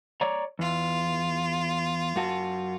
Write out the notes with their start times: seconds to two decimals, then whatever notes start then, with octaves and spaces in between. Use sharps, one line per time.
0.21 C#5 D5 A#5
0.59 E2 F4
2.16 F#2 F#4 A5